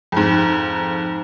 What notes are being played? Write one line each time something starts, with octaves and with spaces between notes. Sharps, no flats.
F2 G#2